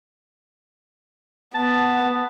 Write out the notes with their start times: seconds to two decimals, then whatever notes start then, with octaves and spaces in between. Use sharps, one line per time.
1.55 B3 A5